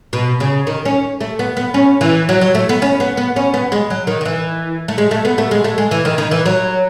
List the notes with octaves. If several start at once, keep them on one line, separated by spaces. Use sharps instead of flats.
B2
C#3
D#3
C#4
A3
B3
B3
C#4
E3
F#3
F#3
A3
B3
C#4
B3
B3
C#4
B3
G#3
F#3
D#3
D#3
E3
A3
G#3
A3
B3
A3
G#3
A3
G#3
E3
D#3
D#3
E3
F#3